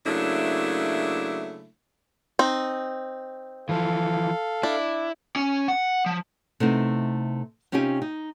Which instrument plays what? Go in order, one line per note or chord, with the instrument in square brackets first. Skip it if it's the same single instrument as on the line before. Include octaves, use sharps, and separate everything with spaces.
[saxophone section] C#3 F#3 A3 A#3 D4 E4
[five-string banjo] C4 D#4
[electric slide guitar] E3 F3 [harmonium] A4 F5
[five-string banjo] D4 [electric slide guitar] E4
[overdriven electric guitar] C#4
F#5
F3
[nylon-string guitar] C3 A3 B3 D#4 E4
C3 C#4 D#4 F4 G4 G#5
D#4